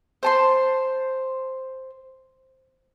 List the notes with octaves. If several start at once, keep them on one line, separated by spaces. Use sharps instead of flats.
C5 A5 C6